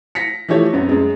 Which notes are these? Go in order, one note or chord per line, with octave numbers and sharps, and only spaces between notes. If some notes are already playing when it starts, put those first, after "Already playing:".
A#6 B6 C#7
E3 F3 A3 G4 C#5
F#2 B3 C4
F#2 G#3